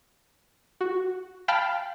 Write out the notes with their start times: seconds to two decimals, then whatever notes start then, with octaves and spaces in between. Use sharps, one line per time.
0.81 F#4
1.48 F5 G5 A5 B5 F6